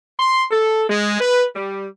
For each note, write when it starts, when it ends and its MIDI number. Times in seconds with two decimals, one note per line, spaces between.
0.19 0.44 84
0.51 0.83 69
0.89 1.17 56
1.19 1.44 71
1.54 1.85 55